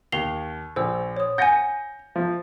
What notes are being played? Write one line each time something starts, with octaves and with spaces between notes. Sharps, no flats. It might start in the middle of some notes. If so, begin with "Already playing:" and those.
D#2 C7 F7 G7
A#1 C5 E6
C#5 D#6
F#5 G#5 G6 A#6 C#7
F3